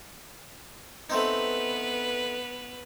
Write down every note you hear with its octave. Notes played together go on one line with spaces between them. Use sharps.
A3 B3 C4 D#4 B4